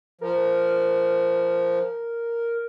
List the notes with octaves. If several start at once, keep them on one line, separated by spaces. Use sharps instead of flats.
F3 A#4